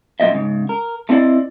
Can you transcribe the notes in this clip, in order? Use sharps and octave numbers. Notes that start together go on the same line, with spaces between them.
F#2 A#2 D#5 E5
G#2 C#3
A#4
A3 C4 E4 G4 D5 D#5